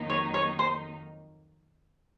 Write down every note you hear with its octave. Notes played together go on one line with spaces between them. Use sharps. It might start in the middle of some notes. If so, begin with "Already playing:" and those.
Already playing: F2 D#3 F#3 A#3 D#4
C#5
C#5
C5